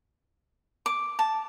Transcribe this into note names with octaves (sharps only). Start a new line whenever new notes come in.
D6
A5